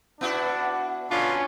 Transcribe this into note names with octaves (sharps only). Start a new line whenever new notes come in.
B3 D4 E4 F#4
B2 D3 C#4 D4 F4